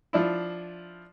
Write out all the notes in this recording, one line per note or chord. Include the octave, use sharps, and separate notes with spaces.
F3 D4 E4